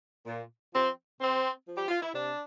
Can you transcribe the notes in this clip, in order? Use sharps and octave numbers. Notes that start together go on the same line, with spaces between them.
A#2
F3 C4
C3 C4
F3
G4
F4
E4
C3 D4